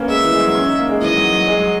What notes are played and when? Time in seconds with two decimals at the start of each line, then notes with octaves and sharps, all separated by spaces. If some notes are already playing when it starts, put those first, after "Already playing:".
Already playing: A#3 B3 C#4
0.08 G#3 E5
0.25 E3
0.34 G#3
0.40 F#3
0.55 C#4
0.67 D#4
0.79 A#3
0.89 G#3
1.01 E3 D#5
1.17 F#3
1.32 F#3
1.48 G#3
1.60 F#3